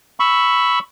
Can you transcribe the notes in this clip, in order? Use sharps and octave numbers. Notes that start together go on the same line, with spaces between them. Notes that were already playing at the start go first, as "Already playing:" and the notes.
B5 C#6 E6